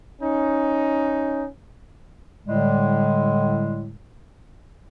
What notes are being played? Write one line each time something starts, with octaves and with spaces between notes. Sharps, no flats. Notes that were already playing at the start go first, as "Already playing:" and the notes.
C#4 D#4
A2 D3 G3 G#3